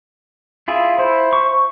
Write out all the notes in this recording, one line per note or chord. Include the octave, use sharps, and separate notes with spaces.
E4 F4 G#4
E4 C5
C#6